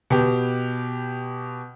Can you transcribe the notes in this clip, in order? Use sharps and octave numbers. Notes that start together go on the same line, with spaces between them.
B2 G4